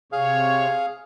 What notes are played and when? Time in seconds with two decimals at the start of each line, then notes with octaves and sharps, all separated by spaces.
0.12 C3 G#4 C#5 F5